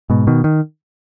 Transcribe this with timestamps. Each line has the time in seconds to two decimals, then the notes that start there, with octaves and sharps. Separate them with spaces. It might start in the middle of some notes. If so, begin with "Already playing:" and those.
0.10 G#2 B2
0.27 B2 D#3
0.44 D#3